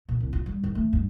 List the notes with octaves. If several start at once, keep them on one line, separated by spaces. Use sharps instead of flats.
A#2
C2
F4
G3
D#3
A3
G2